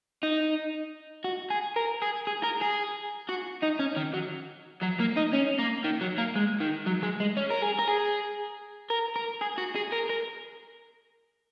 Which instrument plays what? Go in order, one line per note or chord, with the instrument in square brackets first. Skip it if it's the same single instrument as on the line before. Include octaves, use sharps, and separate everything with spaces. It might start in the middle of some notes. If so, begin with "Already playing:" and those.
[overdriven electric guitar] D#4
F#4
G#4
A#4
G#4
G#4
A#4
G#4
F#4
D#4
C#4
D#3
F#3
F#3
A#3
D#4
C#4
A#3
D#3
F#3
A#3
G#3
D#3
F#3
G#3
G#3
C#4
A#4
G#4
A#4
G#4
A#4
A#4
G#4
F#4
G#4
A#4
A#4